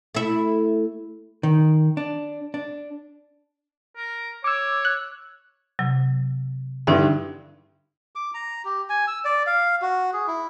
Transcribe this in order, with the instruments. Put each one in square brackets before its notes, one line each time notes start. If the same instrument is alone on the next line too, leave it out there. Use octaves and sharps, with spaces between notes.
[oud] A3 E4
[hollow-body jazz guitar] D#3
D4
D4
[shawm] A#4
[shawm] C#5 [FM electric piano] D6 E6
[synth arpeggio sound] F#6
[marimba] C3 F#3
[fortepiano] G2 D3 [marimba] D#4 E4 E5
[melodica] D6
A#5
G4
G#5
E6
D5
F5
F#4
G#4
E4